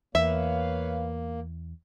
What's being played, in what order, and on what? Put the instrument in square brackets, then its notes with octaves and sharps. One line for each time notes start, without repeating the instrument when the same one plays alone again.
[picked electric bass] E2 [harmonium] A#3 [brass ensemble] B4 C#5 F5 [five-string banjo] E5